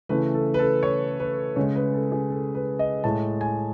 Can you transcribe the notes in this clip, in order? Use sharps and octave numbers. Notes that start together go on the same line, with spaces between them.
C#3 E3 A3 B4
A4
B4
A4
C#5
B4
C#3 G#3 C#5
B4
A4
G#4
A4
B4
D#5
A2 G#3 A5
G#5